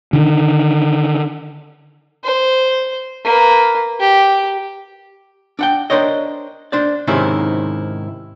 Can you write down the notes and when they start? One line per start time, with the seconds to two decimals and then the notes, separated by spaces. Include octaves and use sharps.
0.13 D3 D#3
2.24 C5
3.25 A#3 B4
4.00 G4
5.59 D4 F#5 G5
5.90 D4 A#4 C5 C#5 D#5
6.72 D4 C5 D5
7.07 G#2 C3 D#3 C#4 E4